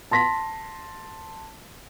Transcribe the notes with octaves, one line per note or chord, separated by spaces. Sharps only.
A5 C6 A#6 B6